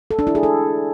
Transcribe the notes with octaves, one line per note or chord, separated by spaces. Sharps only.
A4
D4
E4
G#4
A4